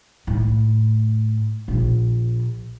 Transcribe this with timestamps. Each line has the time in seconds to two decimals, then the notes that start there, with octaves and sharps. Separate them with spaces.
0.27 A2
1.68 A#1